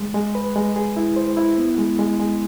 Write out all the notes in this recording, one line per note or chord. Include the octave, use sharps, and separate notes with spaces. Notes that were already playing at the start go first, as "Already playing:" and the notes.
Already playing: G#3
G#3
B4
G#3
G#4
E4
C5
E4
B3
G#3
G#3
G#3